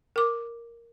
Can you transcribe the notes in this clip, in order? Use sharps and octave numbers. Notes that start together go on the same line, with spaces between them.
A#4 D6